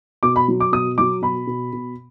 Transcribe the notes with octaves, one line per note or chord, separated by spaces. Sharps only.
B2 D6
B5
F#3
D6
B2 D#6
F#3 D6
B2 B5
B2
B2